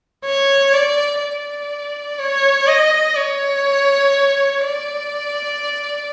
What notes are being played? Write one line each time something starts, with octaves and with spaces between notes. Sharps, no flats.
C#5
D5
D5
C#5
D#5
C#5
D5